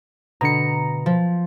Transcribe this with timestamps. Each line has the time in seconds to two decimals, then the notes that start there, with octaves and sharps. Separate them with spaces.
0.41 B2 D3 A#5 C#7
1.06 F3